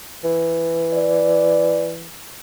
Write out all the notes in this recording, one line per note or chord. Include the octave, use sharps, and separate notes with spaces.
E3
D5